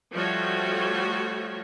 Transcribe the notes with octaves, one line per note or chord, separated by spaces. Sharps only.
F3 G3 A3 F#4 C#5